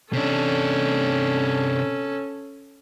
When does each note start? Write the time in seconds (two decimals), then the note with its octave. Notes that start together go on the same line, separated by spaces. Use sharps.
0.13 C3 C#4 D4 A4